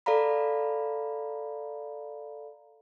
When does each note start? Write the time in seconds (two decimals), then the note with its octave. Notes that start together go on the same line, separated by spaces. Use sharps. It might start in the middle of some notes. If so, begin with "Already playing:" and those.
0.06 A4 D5 F5 A#5 B5